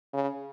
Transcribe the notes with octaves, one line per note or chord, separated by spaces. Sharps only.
C#3